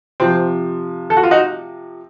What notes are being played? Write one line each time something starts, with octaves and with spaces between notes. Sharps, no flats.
C3 F3 C4
A4
F#4
F4
D#4 F#4